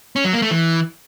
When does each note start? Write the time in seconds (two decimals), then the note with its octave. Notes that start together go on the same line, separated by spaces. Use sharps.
0.16 C#4
0.25 F#3
0.33 A#3
0.42 A3
0.51 E3